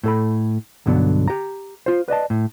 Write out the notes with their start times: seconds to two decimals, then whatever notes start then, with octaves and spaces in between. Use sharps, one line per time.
0.04 A2 A4 B5
0.86 B1 G2 D3 F#3 B3
1.28 G4 A#5
1.86 F4 C5
2.08 B4 D5 D#5 A5
2.30 A2